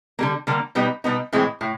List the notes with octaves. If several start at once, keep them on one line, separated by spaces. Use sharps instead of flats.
D3 G3 A#3
D3 G3 A#3
B2 G3 B3 D#4
B2 G3 B3 D#4
A2 E3 G#3 C4
A2